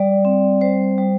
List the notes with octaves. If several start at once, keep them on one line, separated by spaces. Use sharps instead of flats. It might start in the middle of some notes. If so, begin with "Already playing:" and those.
Already playing: G3 D5
C4
G3 C5
G3